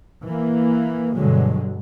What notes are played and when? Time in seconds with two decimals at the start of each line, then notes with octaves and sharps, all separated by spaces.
0.24 E3 A#3
1.15 G2 B2 D3 F#3 G#3